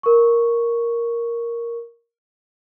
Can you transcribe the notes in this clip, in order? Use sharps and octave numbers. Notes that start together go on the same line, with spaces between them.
A#4 C#6